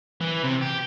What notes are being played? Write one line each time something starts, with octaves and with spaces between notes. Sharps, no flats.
E3
C3
G4